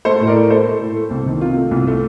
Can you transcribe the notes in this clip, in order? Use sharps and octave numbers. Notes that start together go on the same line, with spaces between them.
A3 A4 C5
A2
A#4 D5
A2
A3 A4 C5
A3
A2
A3
C2
D#3
C3 F4
A3
C2
A3